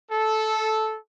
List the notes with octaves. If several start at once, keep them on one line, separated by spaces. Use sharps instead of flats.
A4